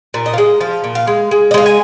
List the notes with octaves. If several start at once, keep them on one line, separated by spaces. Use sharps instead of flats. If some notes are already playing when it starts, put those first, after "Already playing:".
A#2
D#5
F5
G#3 D#5
F3 F5
A#2
F5
G#3
G#3
D#5
G#3 F5
G#5